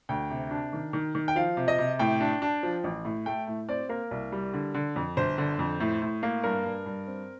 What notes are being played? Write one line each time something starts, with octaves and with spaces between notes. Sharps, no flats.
D2 G5
C3
D4
D#3
D#3
D#3
G5
F3 F5
C3
D#5
C3
A2 G5
D4
D4
F3
A1
A2
A3 G5
A2
C4 D5
A#3 A#4
C2
G3
D3
D3
F2
G1 C5
D3
F2
A2
A2
A#3
G2 A#4
G2
G2
C4